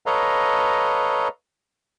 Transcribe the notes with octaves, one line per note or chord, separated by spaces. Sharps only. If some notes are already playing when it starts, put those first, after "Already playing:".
A4 B4 C#5 D#5 F5 A#5